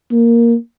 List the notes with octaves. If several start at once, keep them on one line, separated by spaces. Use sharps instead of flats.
A#3